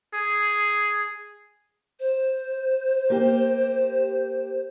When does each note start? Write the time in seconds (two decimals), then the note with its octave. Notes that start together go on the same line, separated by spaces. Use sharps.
0.14 G#4
2.00 C5
3.10 A#3 G4